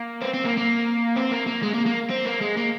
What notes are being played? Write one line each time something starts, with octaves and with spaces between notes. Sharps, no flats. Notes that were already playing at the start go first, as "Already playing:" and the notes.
Already playing: A#3
C4
C4
A#3
A#3
C4
A#3
A#3
G#3
A#3
A#3
C4
A#3
G#3
A#3